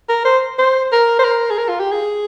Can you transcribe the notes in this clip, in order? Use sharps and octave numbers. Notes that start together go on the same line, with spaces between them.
A#4
C5
C5
A#4
C5
A#4
G#4
A#4
F4
G4
G#4